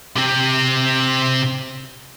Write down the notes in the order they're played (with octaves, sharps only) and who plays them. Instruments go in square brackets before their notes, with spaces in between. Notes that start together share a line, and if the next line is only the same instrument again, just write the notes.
[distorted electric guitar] C3 C4